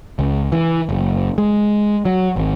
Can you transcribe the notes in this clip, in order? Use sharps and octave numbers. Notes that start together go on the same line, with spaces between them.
C#2
E3
F#1
G#3
F#3
G#1